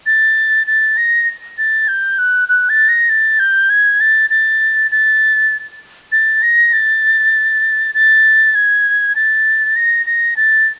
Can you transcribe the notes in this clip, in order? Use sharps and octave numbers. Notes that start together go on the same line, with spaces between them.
A6
A6
A#6
A6
G6
F#6
F#6
A6
A#6
A6
G6
G#6
A6
A6
A6
A6
A#6
A6
A6
G#6
A6
A#6
A#6
A6